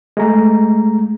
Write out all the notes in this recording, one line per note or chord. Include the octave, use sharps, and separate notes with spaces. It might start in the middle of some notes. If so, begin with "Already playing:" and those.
G#3 A3 A#5